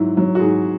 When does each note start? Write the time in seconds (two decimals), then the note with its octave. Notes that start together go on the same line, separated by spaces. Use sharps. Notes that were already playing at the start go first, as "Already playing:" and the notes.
Already playing: G#2 F#3 E4
0.17 F#3
0.35 F#4
0.39 G#2 G#4